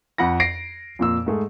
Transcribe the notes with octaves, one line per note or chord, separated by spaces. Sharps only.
F2 F#5 B5 A#6
A#6 C7 D7
F2 A#2 E6
G#2 A3 G#4